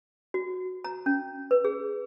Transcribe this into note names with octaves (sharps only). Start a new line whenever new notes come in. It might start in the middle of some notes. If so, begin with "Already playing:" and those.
F#4
A#5
C#4
B4
G#4